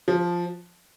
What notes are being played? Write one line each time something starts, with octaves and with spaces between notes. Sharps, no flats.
F3